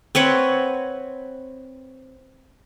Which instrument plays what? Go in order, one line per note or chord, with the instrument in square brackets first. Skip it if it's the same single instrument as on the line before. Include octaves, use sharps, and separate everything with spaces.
[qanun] C4 B4 C#5 F#5